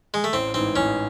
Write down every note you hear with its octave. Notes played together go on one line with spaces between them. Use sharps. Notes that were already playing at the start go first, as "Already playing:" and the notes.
G#3
A3
A1 C4
G#2 E3 C4
A1 C#4